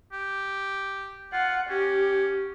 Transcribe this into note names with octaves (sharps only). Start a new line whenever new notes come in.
G4
F4 F#5
C#4 G4